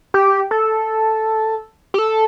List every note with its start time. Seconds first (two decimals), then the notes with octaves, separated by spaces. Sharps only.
0.14 G4
0.51 A4
1.94 G4
1.99 A4